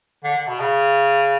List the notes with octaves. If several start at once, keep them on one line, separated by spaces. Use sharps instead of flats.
D3
D3
B2
C#3